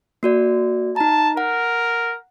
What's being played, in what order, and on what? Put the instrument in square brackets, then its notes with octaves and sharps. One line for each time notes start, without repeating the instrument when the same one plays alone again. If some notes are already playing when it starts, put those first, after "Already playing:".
[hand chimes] A#3 F#4 D5
[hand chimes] D#4 A#5 [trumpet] A5
[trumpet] A#4 [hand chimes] F#5